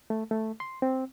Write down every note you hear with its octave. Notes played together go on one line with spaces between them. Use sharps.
A3
A3
C6
C4